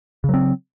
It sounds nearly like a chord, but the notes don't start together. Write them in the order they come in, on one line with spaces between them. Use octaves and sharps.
C#3 F#3 C4